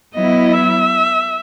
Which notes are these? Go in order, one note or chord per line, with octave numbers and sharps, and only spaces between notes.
F#3 B3 E4 D#5
E5